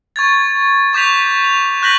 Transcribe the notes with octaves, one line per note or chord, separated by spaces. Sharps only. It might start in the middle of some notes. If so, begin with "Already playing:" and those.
C#6 G#6 A6
C#6 D6 G6 B6 F7
F7
C#6 F#6 G6 A#6 B6 F#7